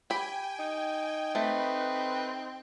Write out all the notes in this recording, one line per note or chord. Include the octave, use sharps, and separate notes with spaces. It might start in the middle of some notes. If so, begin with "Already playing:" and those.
G4 G5 G#5 B5
D#4
A3 C4 B4